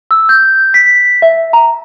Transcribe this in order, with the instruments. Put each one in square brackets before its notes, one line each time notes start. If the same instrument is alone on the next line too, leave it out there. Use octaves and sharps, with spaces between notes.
[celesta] E6
G6
B6
E5
A#5